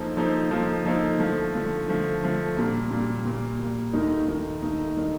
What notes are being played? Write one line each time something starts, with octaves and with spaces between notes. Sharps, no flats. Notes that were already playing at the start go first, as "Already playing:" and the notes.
Already playing: F3 A#3 D#4 A4 C5
F3 A#3 D#4 A4 C5
F3 A#3 D#4 A4 C5
F3 A#3 D#4 A4 C5
D3 F3 A3
D3 F3 A3
D3 F3 A3
D3 F3 A3
A#2 G3 A#3
A#2 G3 A#3
A#2 G3 A#3
A#2 G3 A#3
D#2 D#3 A3 D#4 A#4
D#2 D#3 A3 D#4 A#4
D#2 D#3 A3 D#4 A#4
D#3 A3 D#4 A#4